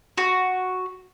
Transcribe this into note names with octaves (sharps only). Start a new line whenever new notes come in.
F#4